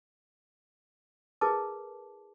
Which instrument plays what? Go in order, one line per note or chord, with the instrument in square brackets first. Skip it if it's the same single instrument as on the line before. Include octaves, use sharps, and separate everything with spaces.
[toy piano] E4 G#4 A#4 B4 A5 D6